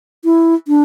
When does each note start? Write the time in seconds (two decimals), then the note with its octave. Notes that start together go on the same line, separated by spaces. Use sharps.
0.25 E4
0.68 D4